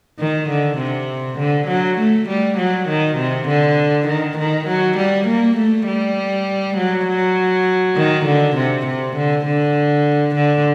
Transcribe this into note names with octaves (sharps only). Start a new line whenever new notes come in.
D#3
D3
C3
D3
F#3
A3
G3
F#3
D#3
C3
D3
D#3
D#3
F#3
G3
A#3
A3
G3
F#3
F#3
D#3
D3
C3
C3
D3
D3
D3